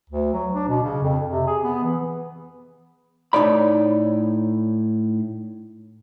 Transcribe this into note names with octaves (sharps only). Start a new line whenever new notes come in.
D2
F#3
D4
B2
C#3
F2
C3
G#4
B3
E3
A2 D#4 C#5 D5 B5